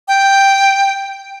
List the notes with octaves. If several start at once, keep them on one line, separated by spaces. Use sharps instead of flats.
G5